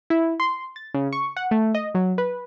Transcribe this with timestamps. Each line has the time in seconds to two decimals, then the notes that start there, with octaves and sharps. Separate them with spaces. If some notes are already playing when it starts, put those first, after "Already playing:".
0.10 E4
0.40 C6
0.76 A6
0.94 C#3
1.13 C#6
1.37 F#5
1.51 A3
1.75 D#5
1.95 F#3
2.18 B4